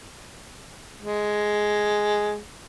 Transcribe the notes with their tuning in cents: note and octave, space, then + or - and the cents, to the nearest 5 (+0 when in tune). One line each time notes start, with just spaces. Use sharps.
G#3 +5